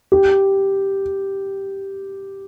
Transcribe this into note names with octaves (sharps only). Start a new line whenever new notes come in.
G4